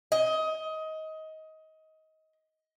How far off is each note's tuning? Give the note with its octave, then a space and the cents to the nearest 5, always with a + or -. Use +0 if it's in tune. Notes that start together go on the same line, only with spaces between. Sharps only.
D#5 +20